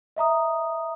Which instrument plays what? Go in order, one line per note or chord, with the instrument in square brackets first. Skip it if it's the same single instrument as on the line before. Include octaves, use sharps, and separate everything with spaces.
[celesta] D#5 E5 A#5 D#6